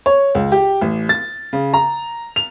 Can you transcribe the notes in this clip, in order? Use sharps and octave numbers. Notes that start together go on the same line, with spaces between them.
C#5
C#2
G4
A1
A6
C#3
A#5
F7